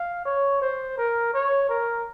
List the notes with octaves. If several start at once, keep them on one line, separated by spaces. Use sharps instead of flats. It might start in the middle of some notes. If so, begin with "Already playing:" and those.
Already playing: F5
C#5
C5
A#4
C#5
A#4